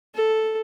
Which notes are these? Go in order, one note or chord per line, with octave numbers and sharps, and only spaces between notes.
A4